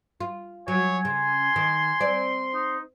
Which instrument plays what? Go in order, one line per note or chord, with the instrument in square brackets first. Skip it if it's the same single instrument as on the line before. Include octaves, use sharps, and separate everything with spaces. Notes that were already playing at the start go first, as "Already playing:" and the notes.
[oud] F4
[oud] F#3 [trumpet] C#5 [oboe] G#5
[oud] C#3 [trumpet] C6
[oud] D#3
C4 D5
[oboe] D#4